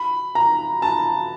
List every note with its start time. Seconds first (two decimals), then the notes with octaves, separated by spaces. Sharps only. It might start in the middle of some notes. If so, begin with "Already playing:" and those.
Already playing: B5
0.35 A#5
0.82 A5